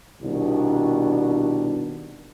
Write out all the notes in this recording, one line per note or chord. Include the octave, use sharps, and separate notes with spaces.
C2 B2 D#3 D4